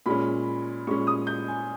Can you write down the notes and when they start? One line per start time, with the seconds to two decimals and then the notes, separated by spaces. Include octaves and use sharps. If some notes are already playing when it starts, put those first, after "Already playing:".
0.06 A#2 G#3 C#4 B5
0.87 A#2 G#3 C#4 C#6
1.07 D#6
1.27 G6
1.48 G#5